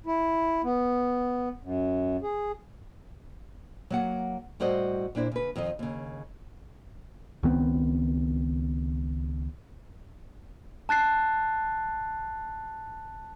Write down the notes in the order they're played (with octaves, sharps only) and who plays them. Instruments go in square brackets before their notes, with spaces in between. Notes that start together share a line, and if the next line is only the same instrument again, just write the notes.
[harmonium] E4
B3
F#2
G#4
[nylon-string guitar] F#3 A#3 F#5
A2 G3 F#4 A4 C5 D#5
A#2 D4 E4 C5
C#3 B4
F2 D#3 F4 D#5
D#2 C#3
[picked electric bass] C#2 D#3 B3 C4
[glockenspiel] A5 F#6 A6 C7